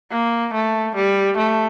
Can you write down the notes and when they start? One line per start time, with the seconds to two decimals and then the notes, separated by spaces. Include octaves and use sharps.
0.11 A#3
0.53 A3
0.95 G3
1.37 A3